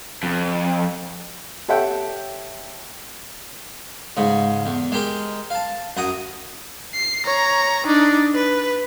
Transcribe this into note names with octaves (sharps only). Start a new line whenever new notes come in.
F2
G4 A4 C#5 E5 F#5 G5
G#2 C#3
E2
G#3 G4 A#4
F5 A5
F#2 F#5 A#5 D#6
C7
C#5 A#5
D4 D#4
B4